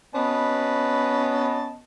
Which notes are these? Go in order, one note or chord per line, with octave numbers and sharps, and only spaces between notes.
B3 C#4 B4 D#5 A5